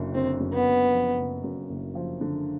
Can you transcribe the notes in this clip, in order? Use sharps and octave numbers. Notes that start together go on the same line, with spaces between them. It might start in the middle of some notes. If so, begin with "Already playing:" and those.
Already playing: F#1 F#2 D3
D3 C4
F#2
B3
F#1
F3
F#1
F#2
F#1
F3
D3